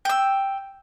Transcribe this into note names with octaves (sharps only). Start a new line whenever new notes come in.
G5 E6